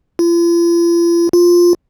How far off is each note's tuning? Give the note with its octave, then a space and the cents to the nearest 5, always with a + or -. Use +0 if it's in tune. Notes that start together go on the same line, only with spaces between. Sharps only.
F4 -40
F4 +5